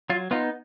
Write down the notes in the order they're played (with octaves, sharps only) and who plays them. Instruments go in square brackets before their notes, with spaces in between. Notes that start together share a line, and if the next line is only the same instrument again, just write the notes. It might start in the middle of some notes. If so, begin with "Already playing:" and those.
[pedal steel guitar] F#3 F4
B3 D#4 F4